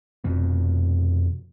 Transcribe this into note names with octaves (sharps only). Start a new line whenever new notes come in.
F1 F2 B2